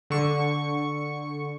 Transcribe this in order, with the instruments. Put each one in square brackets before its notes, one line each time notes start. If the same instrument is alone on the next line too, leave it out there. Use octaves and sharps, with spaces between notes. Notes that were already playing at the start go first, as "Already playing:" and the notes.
[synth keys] D3 C#6 C#7